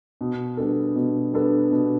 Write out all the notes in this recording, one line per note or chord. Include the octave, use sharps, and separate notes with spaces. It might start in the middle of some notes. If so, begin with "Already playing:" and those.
B2
G3 B3 D4 A4
B2
G3 B3 D4 A4
B2